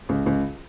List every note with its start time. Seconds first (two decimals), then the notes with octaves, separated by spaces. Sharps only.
0.09 C#2
0.26 C#2